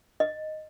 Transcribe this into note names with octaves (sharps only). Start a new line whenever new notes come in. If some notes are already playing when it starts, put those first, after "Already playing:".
D#5